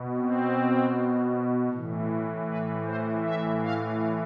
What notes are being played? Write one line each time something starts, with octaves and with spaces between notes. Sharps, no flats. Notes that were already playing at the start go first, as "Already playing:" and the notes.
Already playing: B2
C4
A2 E3
B4
C5
E5
F5